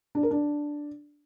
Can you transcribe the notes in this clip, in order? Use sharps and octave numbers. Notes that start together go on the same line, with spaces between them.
D4
A#4
D4